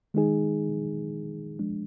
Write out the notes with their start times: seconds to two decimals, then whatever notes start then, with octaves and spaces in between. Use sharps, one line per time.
0.14 D#3 G#3 D#4 G#4
1.59 F3 G#3 D4